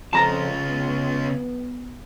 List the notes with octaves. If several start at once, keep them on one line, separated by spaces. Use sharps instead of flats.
F2 C#3 F4 A5 A#5
B3